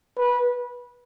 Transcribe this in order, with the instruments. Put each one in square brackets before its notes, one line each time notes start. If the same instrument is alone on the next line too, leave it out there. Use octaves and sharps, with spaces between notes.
[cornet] B4